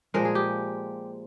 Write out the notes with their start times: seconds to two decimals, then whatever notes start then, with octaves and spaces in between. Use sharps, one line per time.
0.14 A#2 F3 G#3 A#4
0.25 G#4
0.35 G4